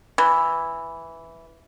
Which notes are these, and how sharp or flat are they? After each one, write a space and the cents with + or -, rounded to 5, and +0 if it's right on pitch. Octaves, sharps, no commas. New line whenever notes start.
E3 +0